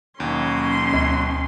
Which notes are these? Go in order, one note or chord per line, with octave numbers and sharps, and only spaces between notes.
D#2 B2 F#3 C#4 C6
D2